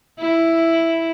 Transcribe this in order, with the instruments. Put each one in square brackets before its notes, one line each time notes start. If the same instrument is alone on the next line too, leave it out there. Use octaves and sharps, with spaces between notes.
[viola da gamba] E4